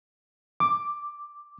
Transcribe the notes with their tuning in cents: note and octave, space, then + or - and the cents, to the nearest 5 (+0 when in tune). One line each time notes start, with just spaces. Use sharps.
D6 +5